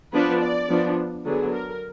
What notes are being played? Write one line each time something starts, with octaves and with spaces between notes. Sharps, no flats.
F3 B3 D4 B4
D5
F3 B3 D4
D3 F#3 B3 D4 G#4
A#4